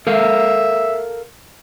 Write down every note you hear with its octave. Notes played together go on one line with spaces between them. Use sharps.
A4 A#4 E5 F5